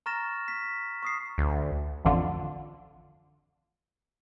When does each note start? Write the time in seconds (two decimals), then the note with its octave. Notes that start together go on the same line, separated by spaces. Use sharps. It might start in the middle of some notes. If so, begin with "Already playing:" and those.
0.06 A#5 C#6 F6 A6 A#6 E7
0.48 B6
1.02 C#6 D#6 C7
1.38 D2
2.05 A1 F2 D3 F4